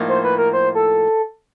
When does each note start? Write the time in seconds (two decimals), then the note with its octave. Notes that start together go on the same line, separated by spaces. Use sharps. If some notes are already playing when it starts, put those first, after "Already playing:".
Already playing: A2 F3 A#3 D#4
0.09 C5
0.24 B4
0.38 A#4
0.53 C5
0.75 A4